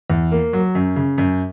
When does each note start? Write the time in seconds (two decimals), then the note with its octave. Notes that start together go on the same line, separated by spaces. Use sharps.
0.10 E2
0.32 A#3
0.53 F#3
0.75 F#2
0.96 C#3
1.18 F#2